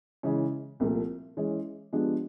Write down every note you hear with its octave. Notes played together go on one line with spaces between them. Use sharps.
C#3 E3 G#3
C2 A#2 F3 A3
E3 G#3 C#4
F3 G#3 B3 D4 G4